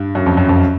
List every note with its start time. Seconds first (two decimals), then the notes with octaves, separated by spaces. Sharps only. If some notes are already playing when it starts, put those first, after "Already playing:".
Already playing: G2
0.15 F#2
0.26 F2
0.37 F#2
0.49 F2